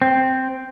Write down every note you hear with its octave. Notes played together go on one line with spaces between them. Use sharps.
C4